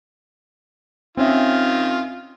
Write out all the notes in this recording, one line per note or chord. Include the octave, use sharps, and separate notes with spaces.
D#3 C4 C#4 F4 E5